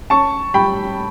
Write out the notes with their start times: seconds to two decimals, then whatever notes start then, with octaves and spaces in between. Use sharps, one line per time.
0.10 C#4 A5 C#6
0.54 G3 G5 B5